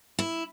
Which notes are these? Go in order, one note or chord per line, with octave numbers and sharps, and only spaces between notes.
E4